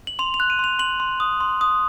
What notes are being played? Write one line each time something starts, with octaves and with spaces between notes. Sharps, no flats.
F#7
C6 F7
F7
F#6
D#7
C6 F7
C6 F#7
C6
D#6
C6
D#6